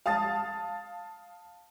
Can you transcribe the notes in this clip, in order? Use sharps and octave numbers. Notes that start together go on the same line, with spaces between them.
F5 A5 D#6 A6